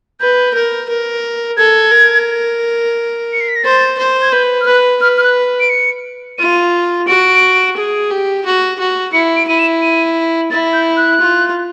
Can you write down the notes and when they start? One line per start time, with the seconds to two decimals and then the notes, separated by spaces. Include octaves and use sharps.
0.20 B4 G6
0.54 A#4
0.89 A#4
1.57 A4 G#6
1.91 A#4
3.33 C#7
3.40 C7
3.48 B6
3.56 A#6
3.63 C5 A6
3.98 C5
4.22 G#6
4.32 B4 G6
4.61 F6
4.66 B4 F#6
5.01 B4 F6
5.17 F6
5.23 F#6
5.60 D7
5.69 C#7
6.38 F4 D#7
7.07 F#4 D7
7.76 G#4
8.10 G4
8.45 F#4
8.79 F#4
9.13 E4 C#7
9.36 D7
9.48 E4 D#7
9.59 E7
9.82 D#7
10.51 E4 A6
10.73 G6
10.97 F#6
11.20 F4